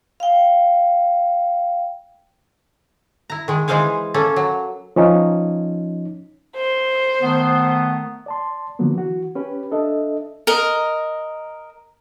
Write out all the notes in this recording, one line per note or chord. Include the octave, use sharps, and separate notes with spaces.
F5 G5
E4 A#5
D#3 G#3
E3 G#3 G#4 C5 F5 G#5
A#3 C#4 A4
F#3
F3 C#4 D#4
C5
D#3 A3 B3
D5 A5 C6
D3 F3 F#3 A#3 B3
E3 F#4
C#4 G4 B4
D4 A4 D#5 E5
A#4 D#5